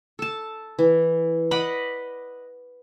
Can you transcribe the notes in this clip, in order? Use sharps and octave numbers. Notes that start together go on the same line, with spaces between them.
A4 A5
E3
D5 D#5 F#5 B5